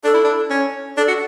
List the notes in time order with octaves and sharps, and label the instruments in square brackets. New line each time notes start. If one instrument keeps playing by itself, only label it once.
[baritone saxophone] D4 [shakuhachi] A4
[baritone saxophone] E4
D4
C#4
[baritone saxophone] D4 [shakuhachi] A4
[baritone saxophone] F#4